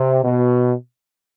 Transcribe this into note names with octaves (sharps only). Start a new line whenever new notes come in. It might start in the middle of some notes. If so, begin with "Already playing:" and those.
Already playing: C3
B2